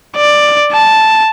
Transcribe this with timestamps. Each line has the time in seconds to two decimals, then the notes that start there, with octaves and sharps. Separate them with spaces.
0.16 D5
0.72 A5